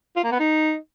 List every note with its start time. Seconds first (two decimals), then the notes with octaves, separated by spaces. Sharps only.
0.16 F4
0.24 A#3
0.32 B3
0.40 D#4